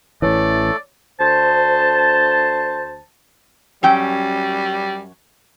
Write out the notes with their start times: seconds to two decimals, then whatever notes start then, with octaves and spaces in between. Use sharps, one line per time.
0.22 A1 E3 A3 A4 C#5 D5
1.20 D2 C5 A5
3.83 F#2 G3 C#4 G5